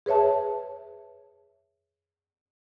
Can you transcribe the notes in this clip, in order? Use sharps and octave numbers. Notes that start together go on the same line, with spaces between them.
G#4 B4 C#5 E5 A5